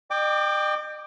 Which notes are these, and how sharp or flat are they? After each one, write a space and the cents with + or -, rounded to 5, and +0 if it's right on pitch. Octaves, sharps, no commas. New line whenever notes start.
D#5 -45 G5 +15 D6 +0